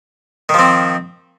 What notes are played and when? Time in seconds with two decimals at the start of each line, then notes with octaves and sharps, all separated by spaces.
0.49 D#3
0.54 F3
0.59 C4